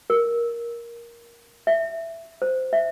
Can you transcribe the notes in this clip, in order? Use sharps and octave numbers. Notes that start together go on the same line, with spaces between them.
A#4
E5
C5
E5